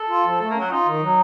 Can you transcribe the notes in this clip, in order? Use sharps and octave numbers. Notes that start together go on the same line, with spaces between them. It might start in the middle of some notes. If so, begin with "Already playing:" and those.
Already playing: A4
F4
F3
A3 A4
A#3 C#4
F#3
D#4 F4
D#3
F#3